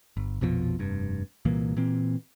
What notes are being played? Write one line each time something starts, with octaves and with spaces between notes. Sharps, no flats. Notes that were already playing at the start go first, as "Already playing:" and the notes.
G1
A#1 F2 B2 F3
F1 G2
C2 A#2 E3 A#3
A#2 E3 C4